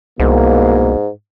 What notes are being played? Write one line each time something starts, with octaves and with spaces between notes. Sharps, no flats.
C2 G#2 B2 A#3